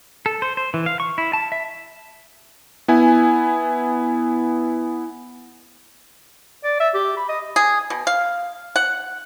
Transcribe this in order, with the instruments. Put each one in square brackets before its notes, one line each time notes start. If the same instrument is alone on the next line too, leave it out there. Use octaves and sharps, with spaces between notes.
[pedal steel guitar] A4
C5
C5
E3
F5
C#6
E4
A5
E5
[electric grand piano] B3 E4 G#5
[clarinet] D5
E5
G4
B5
D#5
[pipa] G#4
B2
F5
F#5